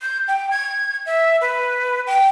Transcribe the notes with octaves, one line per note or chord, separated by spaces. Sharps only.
G6
G5
G#6
E5
B4
G5